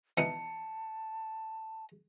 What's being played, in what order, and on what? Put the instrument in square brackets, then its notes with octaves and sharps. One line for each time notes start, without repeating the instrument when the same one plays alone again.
[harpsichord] B2 E3 D#4 [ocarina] A5 [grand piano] C#7